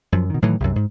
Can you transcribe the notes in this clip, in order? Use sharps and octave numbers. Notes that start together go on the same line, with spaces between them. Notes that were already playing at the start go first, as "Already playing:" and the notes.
F#2 F3
B2 D#3
A2 D#3 E3 F#3
C2 F#2
G#2